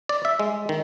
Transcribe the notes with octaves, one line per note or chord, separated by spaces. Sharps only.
D5
E5
G#3
D#3